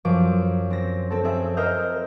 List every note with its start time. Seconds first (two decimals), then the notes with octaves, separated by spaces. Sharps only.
0.05 F#2 F3 D6
0.70 C4 A#6
1.10 C4 A4
1.24 C4 G#4 E5
1.57 A#4 C5 D#5 E5 F6 G6